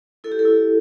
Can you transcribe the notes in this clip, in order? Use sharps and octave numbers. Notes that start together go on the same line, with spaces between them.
E4 A4
G4
A4
E4